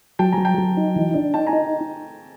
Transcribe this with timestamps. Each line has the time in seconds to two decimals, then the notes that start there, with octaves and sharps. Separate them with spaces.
0.19 F#3 G5 A5
0.32 G#5 A#5
0.38 F#3
0.45 G5 A5
0.58 F#3
0.77 D#4
0.96 E3
1.14 D4
1.34 D#4 G5 A5
1.47 G#5 A#5
1.53 D#4